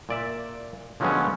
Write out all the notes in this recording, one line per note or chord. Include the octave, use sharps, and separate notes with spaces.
A#2 D5 E5
D3 F3 F#3 G#3 B3 C#4